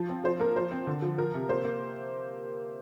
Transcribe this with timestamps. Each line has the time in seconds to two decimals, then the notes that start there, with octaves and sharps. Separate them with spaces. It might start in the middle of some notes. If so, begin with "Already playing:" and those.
Already playing: F3
0.09 C4
0.24 F3 C5
0.40 A#3 A#4
0.56 F3 C5
0.71 C4
0.87 D3
1.02 F3
1.17 F3 A#4
1.34 C3
1.49 A#3 C5
1.65 A#3